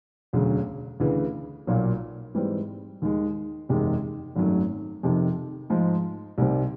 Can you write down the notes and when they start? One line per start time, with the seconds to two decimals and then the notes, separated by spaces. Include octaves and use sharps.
0.33 E1 D2 C#3 F#3
1.00 D2 C#3 E3
1.67 B1 A#2 F#3 A#3
2.35 G#2 E3 G3 C4
3.02 D#2 D#3 G#3
3.69 F#1 E2 C3 D#3 G#3
4.36 G#1 F#2 D#3 F#3 A3
5.03 F2 C3 D#3
5.70 G#2 F3 G#3
6.38 C2 C3 D#3 G3 C4